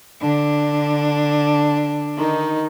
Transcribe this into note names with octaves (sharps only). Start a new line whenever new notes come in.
D3 D4
D#3 D#4